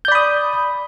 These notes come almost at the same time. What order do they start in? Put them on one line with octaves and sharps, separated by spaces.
G6 D5 B5 D#6